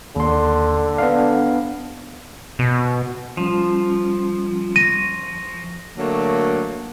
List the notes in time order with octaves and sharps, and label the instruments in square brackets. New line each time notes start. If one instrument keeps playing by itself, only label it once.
[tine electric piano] D#2 C6 [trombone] D3
[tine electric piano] B3 D4 F5
[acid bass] B2
[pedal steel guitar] F3 [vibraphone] G3 C#4 F4
[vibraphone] C#6 [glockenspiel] A#6 [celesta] D#7
[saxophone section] D3 F#3 A3 A#3